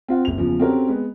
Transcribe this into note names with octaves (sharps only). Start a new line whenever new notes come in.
C4 F4 F#5
F#1 F7
E2 C#3 F3
C4 C#4 F#4 G4 A4 A#4
G#3 B3